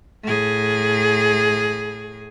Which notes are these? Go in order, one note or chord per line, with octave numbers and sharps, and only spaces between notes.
A2 G#4